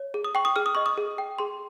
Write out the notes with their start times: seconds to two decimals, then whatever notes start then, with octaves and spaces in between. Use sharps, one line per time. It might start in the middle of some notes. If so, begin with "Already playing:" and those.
Already playing: C#5
0.14 G#4
0.24 D#6
0.35 G5 C#6
0.45 D#6
0.56 G#4 F6
0.66 D#6
0.75 D#5 C#6
0.86 D#6
0.98 G#4
1.18 G5
1.38 G#4 C6